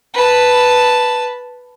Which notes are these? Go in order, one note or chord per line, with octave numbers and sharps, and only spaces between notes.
B4 A5